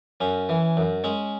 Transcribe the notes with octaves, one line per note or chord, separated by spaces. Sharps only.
F#2 C#4
E3
F#2
G#3 C#4